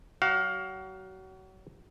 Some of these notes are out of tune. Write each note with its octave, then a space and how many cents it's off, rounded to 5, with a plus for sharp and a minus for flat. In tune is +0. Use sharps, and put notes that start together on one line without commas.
F#3 +30 F#4 +35 F5 +15